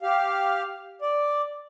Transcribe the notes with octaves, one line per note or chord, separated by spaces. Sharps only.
G4 F5
D5